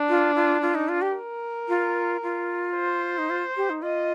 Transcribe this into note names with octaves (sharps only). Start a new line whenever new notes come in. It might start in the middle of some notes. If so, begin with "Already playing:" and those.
Already playing: D4
F4
F4
F4
D#4
F4
G4
A#4
F4
F4
C5
D#4
F4
G4
D#4
F4 D#5